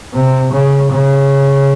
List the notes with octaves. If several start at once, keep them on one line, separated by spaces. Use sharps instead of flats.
C3
C#3
C#3